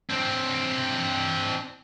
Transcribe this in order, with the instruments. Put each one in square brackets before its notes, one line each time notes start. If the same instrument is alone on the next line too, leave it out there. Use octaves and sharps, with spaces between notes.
[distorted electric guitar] C4 D4